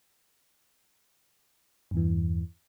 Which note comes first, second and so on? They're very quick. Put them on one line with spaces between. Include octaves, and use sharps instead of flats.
G2 E2 E3